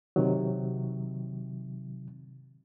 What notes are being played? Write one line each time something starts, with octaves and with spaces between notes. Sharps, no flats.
C3 D#3 F#3